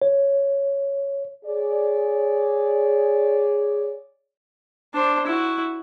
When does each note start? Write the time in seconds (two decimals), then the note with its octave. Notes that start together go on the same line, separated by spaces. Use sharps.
0.02 C#5
1.45 G#4 C#5 D5
4.94 D4 C5
5.27 E4 F#4